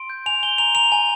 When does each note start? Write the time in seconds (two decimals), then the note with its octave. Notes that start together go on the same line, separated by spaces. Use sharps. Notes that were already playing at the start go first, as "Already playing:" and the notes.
Already playing: C6 D7
0.10 G6
0.26 G#5 F7
0.43 G#5 G7
0.58 A#5 F7
0.75 A#5 F7
0.92 G#5